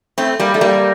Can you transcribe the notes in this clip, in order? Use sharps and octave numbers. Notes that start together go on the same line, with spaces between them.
A3 C4
G3 A#3
A3
G3 A#3